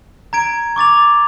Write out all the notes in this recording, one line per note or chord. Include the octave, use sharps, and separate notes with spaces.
A#5 G#6 D7
C#6 D6 A6 F7